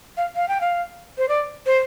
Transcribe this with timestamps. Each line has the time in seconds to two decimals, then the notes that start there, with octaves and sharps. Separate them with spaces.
0.17 F5
0.36 F5
0.48 G5
0.61 F5
1.18 C5
1.29 D5
1.66 C5